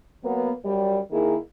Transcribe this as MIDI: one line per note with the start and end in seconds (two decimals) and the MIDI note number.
0.24 0.51 54
0.24 0.51 58
0.24 0.51 59
0.65 0.99 42
0.65 0.99 55
1.11 1.36 51
1.11 1.36 58
1.11 1.36 64
1.11 1.36 68